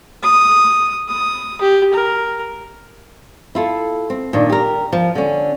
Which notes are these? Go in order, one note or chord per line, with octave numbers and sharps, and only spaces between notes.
D#6
D#6
G4
A#4
E4 F4 A4
C4
A#2 D#3 D4
G4 A#4
F3
D3 C#4